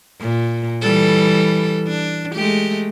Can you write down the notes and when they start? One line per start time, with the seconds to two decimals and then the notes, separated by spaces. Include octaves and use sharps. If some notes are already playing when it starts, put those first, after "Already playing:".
0.20 A#2
0.82 E3 G3 A4
1.87 D4
2.35 G#3 A3 G4